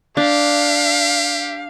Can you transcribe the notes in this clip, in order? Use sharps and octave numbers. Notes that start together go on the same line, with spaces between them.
D4 G4 F5